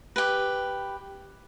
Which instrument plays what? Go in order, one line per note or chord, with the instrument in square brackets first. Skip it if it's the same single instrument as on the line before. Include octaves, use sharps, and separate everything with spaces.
[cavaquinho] G4 B4